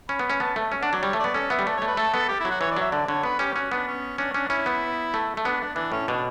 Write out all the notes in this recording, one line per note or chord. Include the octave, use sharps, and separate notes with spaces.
C#4 B5
B3
C#4
B3 A5
A3
C#4
D4 F#5
F#3 D5
G3 C#5
A3
B3 D5
C#4 A4
B3 E5
G3
A3 D5
C#5
A3
B4
A3 A4
B3 A4
G4
E4
F#3
F#4
E3 C#5
D5
F#3 E5
D3 D5
D3 C#5
B3 B4
C#4 G4
C#4 F#4
B3 D4
C#4
C#4 D4
C#4 D4
C#4 E4
B3
A3
A3
B3 D4
D4
E3 D4
A2 C#4
B2 D4